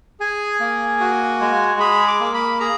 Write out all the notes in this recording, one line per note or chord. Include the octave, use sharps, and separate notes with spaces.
G#4 G#5
A#3
F#4
G#3
G#4 B5
D6
A#3
B5
G#4 A#5